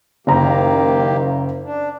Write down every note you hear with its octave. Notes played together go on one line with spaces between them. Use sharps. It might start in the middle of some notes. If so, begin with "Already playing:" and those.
F#1 D#3 A#3 G4 A#5
D4